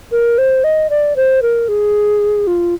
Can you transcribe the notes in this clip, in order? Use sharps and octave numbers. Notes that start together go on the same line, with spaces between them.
A#4
C5
D#5
D5
C5
A#4
G#4
F4